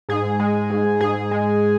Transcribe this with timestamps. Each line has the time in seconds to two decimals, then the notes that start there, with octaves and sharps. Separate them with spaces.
0.09 G#2 G#4
0.40 G#3
0.70 G#2
1.01 G#2 G#4
1.31 G#3